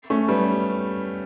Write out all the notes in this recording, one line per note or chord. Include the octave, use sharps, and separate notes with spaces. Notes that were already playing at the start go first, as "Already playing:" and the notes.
A3 C#4
G3 B3